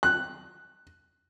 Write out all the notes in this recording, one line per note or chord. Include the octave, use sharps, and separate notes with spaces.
F#6